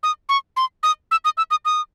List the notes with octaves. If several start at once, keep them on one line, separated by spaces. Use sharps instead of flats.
D#6
C#6
C6
D#6
E6
D#6
E6
D#6
D#6